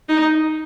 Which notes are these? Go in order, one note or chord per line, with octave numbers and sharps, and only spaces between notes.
D#4